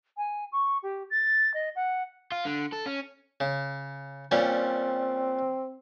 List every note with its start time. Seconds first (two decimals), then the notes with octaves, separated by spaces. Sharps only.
0.17 G#5
0.52 C#6
0.82 G4
1.10 A6
1.54 D#5
1.75 F#5
2.32 F4
2.45 D3
2.72 A4
2.86 C#4
3.40 C#3
4.31 A#2 G3 C4 C#4